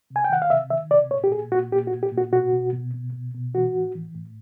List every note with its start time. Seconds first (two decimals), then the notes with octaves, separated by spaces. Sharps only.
0.10 C3
0.16 G#5
0.24 G5
0.30 D#3 F#5
0.42 F5
0.50 C3 E5
0.70 D#3 E5
0.91 C3 D5
1.11 A#2 C#5
1.24 G4
1.31 A#2 G#4
1.52 A#2 F#4
1.71 A#2 G4
1.87 F#4
1.92 A#2
2.03 G4
2.12 A#2
2.18 F#4
2.32 B2 F#4
2.52 B2
2.73 B2
2.94 B2
3.13 B2
3.34 B2
3.54 E3 F#4
3.74 A2
3.95 E3
4.15 A2